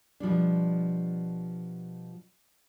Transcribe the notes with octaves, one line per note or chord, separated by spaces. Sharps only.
B2 F3 G3 D4